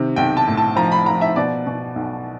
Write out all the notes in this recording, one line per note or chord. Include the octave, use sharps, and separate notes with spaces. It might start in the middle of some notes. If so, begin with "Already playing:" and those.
Already playing: C3 D#3
B1 G5
A5
A2
A5
F3 A#5
B5
F3 A#5
E5
B2 D5
B2
B1